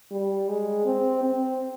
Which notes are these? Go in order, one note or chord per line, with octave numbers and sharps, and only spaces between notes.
G3
G#3
C4
C4